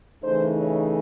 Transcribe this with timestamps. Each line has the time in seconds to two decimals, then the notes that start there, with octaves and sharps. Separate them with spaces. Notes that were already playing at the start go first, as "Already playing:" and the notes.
0.21 C#3 E3 A3 D#4 C5
0.56 C#5